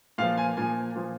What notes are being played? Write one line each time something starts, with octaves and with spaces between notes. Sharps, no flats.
A#2 F3 F5
G#5
A#2 F3 G#5
A#2 F3